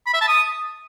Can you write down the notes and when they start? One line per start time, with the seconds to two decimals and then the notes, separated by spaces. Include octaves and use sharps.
0.06 B5
0.14 E5
0.21 A5
0.28 D#6